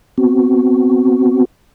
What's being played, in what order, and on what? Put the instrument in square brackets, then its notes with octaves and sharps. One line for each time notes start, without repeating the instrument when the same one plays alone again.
[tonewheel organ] B3 C4 F#4